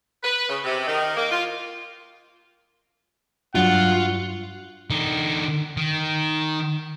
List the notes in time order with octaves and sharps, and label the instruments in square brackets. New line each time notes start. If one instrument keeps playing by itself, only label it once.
[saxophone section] B4
C#3
C3
D#3
A#3
F4
[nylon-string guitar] G2 F#3 D4 [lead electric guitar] F4 [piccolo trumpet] F#5
[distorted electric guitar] D3 D#4
D#3